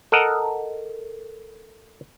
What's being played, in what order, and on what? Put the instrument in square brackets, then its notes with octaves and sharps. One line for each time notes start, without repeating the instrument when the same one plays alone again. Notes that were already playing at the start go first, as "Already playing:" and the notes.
[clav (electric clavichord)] A4 A#4 D#5 F#5